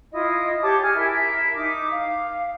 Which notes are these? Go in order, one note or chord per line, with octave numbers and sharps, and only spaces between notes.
E4 F4 D#5
G4 C#5 A5 D6
G#4 F6
E4 A#4 E5
D#4 D6
F5